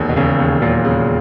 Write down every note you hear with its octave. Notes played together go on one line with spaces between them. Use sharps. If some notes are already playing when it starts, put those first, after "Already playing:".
Already playing: E1 D#2
B2
E1 C#3
D#2
A#2 F#3
C#3